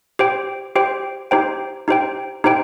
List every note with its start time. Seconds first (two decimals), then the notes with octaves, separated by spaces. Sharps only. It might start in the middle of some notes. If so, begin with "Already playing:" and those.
0.19 G4 C5 G5
0.76 G4 C5 G5
1.31 D#4 G4 C5 G5
1.88 D#4 G4 C5 G5
2.44 D#4 G4 C5 G5